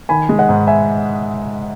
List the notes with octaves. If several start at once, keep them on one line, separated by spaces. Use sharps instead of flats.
D#3 G#5 B5
G#3
D#5 F#5
G#2
E5 G#5